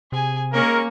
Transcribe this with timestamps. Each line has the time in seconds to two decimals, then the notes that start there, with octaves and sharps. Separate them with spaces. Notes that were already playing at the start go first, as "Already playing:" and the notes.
0.12 C3 G#4 G#5
0.53 G#3 A#3 C#4 A#4 C#6